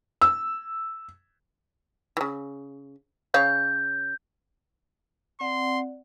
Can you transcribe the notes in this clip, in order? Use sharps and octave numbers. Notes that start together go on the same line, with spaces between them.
E6
C#3 E3
C#3 C#5 F5 G6
C4 D5 F#5 C6